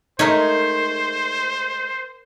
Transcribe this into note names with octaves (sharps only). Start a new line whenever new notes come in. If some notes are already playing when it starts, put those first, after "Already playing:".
G#3 A3 D#4 A#4 C5 C#5